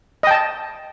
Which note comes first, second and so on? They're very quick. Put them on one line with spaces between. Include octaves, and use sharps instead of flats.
D#5 G5 A5